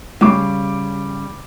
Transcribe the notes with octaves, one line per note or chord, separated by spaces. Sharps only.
C#3 G3 D6